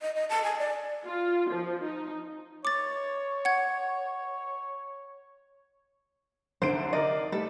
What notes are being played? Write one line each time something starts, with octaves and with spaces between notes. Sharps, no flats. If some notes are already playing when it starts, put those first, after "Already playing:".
D#5
D#5
A5
G#5
D5
F4
F3
D#4
C#5 D6 A6
F#5 G#6
C2 D3 C5 D7
D#4 A#4 D5 D#5
G3 A3 A4